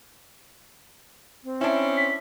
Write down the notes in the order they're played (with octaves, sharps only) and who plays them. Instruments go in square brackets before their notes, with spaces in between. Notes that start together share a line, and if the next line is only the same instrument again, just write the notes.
[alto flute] C4
[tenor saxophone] C#4 [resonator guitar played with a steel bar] D4 E4
[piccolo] B6